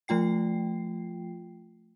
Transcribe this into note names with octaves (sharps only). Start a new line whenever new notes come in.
F3 A3 F4 G5 C7